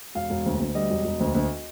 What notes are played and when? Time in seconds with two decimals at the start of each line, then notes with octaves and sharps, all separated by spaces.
0.15 E1 F5
0.30 E1
0.46 D2
0.60 D2
0.75 G3 D#5
0.90 E1
1.05 E1
1.20 D2
1.34 D2